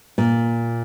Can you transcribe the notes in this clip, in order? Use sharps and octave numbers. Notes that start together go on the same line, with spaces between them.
A#2